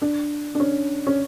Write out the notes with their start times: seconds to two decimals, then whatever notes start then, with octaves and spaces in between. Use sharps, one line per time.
0.02 D4
0.55 D4
0.60 C#4
1.07 C#4